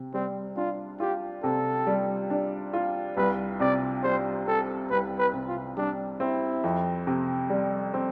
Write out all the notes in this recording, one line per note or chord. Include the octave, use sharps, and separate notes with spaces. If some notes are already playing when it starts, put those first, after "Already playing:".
Already playing: C3
G3 C4
D4 F4
F4 G4
C3 A4
G3
D4
F4
C2 B4
C3 D5
G3 C5
C4 A4
C2 B4
B4
C3
F4
G3 D4
C4 E4
F2
C3
G3
C4